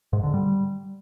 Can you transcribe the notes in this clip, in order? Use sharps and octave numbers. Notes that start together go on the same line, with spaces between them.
G#2
D3
G3